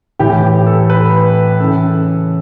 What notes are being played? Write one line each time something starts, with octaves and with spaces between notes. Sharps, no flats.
A2 E3 G4
A4
B4
C#3 E3 A4